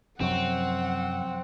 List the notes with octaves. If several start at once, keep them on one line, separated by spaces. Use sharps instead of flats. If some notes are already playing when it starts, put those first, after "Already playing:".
F#2 C3 F3 F#3 C4 F#5 C#6